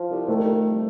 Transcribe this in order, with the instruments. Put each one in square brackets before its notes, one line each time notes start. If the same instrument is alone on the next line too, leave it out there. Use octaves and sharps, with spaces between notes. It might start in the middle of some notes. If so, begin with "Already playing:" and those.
Already playing: [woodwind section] F3
C2
[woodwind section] D#3 [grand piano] A3
[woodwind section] F2
G3